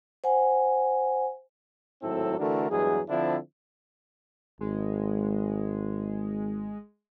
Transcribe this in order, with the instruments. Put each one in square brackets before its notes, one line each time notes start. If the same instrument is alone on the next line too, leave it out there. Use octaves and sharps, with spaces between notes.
[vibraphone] C5 F#5 G#5
[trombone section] G#1 A2 F#3 C4 E4 A4
D3 E3 A3 D4 F#4 A#4
E2 G2 F#3 G#3 G#4
D3 F3 C4 D4 E4
[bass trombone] G#1 [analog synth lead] G#3